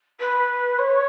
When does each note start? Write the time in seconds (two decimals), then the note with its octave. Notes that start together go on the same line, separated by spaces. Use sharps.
0.20 B4
0.78 C#5